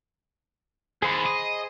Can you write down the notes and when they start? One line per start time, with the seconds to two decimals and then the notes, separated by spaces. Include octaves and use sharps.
1.02 D#2 G#4 C5 B5
1.26 D#5